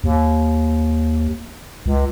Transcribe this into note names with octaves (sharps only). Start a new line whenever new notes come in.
D#2
C#2